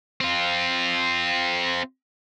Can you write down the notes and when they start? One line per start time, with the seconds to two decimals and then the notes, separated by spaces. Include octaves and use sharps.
0.21 C4 F4